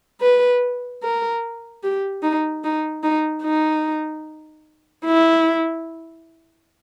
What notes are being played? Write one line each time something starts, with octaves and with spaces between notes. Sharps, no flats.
B4
A#4
G4
D#4
D#4
D#4
D#4
E4